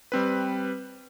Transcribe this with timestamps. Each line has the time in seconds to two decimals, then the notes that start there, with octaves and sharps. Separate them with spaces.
0.12 G3 C4 B4